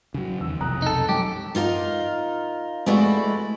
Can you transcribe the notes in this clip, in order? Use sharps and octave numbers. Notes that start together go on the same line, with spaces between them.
C#3 F#3
E2 D#3 E6
B1 F2 C3 A#5 D#6 F#6
D#4 A4
F#2 G4
D#4 F4 A#4 F5
G#3 A3 E4 F#4 B4 D5